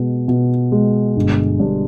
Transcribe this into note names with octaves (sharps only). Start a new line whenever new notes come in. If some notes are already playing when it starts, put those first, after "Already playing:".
Already playing: B2 G#3
B2
G#3
G1
G2